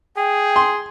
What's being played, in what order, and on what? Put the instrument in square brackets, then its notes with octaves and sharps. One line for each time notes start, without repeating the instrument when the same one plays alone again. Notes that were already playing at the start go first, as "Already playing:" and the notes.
[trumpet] G#4 [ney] G5
[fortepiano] C6